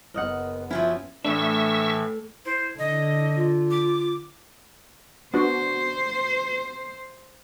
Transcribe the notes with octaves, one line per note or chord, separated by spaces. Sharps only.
F#1 B3 A#4 D#5 F#5
F3 F#3 C#4 E4
A2 E3 A3 D4 E5 C#6 E6
E4 C5
D3 D#5
F4
D6
B3 D4 F#4 C5